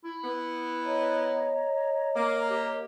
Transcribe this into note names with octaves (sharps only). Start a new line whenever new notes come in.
E4
B3
C#5 D#5 A#5
A#3 D6
G4